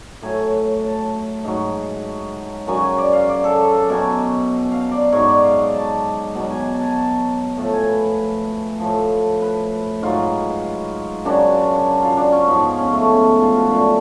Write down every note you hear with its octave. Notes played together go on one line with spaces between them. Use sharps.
A2 F#3 G#5
A5
G#2 F#3
F#2 C#3 F#3 G#5
G#5
D5
F5
D5
A4
A5
B2 F#3 G#5
F5
D5
G#2 F#3 C#5
D5
F5
F#5
A5
B2 F#3 F#5
G#5
F#5
A5
G#5
A5
A2 F3 A5
G#5
B4
A2 F3
B4
G#2 F#3 F4
F#2 C#3 F#3 D4
F4
D4
C#4
G#2 F3 B3
C#4
A3
B3
C#4
F4
F#4
F#2 D3 F3 F4